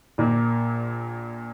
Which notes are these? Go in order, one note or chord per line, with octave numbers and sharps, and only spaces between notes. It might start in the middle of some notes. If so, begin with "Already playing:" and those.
A#1 A#2 A#3